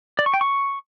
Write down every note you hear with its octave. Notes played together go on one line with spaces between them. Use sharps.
D5
C#6
G5
C#6